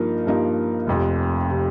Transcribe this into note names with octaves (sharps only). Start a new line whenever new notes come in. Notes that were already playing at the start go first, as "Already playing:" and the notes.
Already playing: G2 F3 A#3 D#4
G2 F3 A#3 D#4
F1 F2 C3
C3